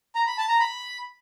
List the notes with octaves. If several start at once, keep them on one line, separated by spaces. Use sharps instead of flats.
A#5
B5
A5
A#5
B5